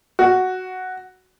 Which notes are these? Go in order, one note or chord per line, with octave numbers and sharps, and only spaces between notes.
F#4